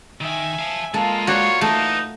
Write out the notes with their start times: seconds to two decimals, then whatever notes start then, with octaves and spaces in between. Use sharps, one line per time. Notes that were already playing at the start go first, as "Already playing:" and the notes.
0.21 D#3 E5 G#5
0.59 F5 A5
0.94 G#3 A#3 F4 A4
1.27 F#4 C#5 D5
1.61 A3 D#4 B4 E5